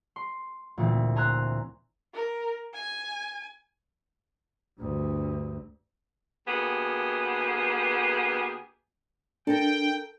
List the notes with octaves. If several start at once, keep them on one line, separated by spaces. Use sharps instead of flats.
C6
D2 A#2 E3 C4
C5 G#5 A#5 C6 E6 F#6
A#4
G#5
D2 G2
D2 A#3 B3 G4 G#4
D4 A4 A#4 G5